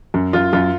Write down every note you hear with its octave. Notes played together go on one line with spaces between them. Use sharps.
F#2
F#2 F4
F#2 F4